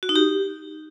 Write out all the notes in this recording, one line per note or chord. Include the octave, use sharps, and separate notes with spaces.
F#4
D#4
G4